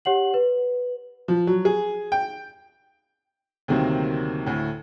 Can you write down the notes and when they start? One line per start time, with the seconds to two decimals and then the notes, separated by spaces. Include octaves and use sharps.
0.05 G4 C#5 F#5 F#7
0.34 B4
1.28 F3
1.47 F#3
1.65 G#4
2.12 G5
3.68 D2 C3 D#3 F#3 A#3 C4
4.46 D2 A2